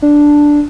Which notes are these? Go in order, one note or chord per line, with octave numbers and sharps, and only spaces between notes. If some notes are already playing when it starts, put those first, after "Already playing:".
D4